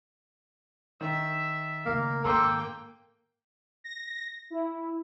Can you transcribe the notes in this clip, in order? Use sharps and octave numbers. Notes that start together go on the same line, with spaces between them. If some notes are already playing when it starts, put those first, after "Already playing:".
D#3 E5
D1 C#3 A#3
G#2 D#3 A#3 A4 G5 A#5 C6 D6
A#6
E4